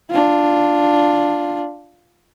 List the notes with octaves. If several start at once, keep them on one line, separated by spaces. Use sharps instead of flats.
D4 F4